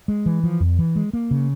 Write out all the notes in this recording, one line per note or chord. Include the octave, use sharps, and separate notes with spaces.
G#3
E3
F3
F2
E3
G#3
A#3
C#3